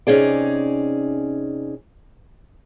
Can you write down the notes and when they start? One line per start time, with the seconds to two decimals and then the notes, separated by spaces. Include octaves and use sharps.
0.07 C3 C#4 D#4 G#4 D5